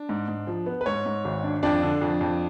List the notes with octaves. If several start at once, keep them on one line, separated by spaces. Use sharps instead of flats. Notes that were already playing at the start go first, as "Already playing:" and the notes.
Already playing: D4
G#2
G#2
F3
B3
B4
G#2 C#5
G#2
G#1
D4
F2 D4 D5
D3
F2
F2